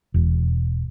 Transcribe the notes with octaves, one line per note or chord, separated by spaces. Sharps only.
E1